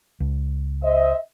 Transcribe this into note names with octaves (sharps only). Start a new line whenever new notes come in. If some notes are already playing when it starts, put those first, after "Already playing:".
C#2
C5 D#5 E5